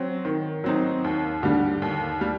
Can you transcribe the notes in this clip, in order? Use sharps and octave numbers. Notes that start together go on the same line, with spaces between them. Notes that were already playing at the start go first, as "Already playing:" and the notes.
Already playing: F#3 C4
D#3
F#3 C4 D#4
D#2
D3 G3
D#2
G3